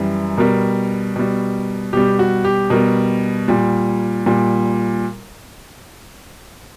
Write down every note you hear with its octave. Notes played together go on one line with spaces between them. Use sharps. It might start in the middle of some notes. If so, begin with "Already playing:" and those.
Already playing: F#2 E3 G3
B2 G3 A#4
B2 G3
B2 G3 G4
F#4
G4
B2 G3 A#4
A#2 G3
A#2 G3